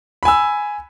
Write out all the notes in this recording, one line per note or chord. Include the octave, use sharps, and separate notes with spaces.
G#5 B5 E6